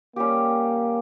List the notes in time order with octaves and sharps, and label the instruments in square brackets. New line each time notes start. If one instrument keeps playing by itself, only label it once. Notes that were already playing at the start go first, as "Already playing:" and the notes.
[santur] G3 C#4 G4 [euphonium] A#3